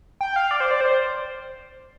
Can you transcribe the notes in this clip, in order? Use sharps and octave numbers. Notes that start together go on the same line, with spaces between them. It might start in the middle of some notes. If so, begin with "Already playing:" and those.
G5
F5
D5
C5
D5
C5